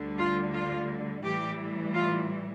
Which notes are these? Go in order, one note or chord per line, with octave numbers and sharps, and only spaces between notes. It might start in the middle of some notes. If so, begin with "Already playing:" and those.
Already playing: D2 D3 G3
F4
F4
A2 E3 G3 G4
F4